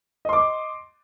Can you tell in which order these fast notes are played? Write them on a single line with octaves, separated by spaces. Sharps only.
D#5 C6 D6